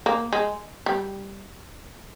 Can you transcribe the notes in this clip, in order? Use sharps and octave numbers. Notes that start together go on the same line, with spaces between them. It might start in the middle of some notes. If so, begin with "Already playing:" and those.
A#3
G#3
G3